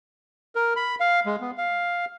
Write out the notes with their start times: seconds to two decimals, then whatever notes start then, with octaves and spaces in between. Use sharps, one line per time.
0.55 A#4
0.76 B5
1.00 F5
1.26 G#3
1.41 B3
1.58 F5